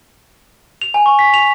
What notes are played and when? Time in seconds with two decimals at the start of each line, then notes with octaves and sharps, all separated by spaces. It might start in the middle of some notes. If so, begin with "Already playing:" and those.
0.82 F7
0.94 G#5
1.06 C#6
1.19 B6
1.34 F7